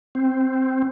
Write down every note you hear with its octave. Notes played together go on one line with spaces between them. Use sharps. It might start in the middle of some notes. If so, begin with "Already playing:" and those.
C4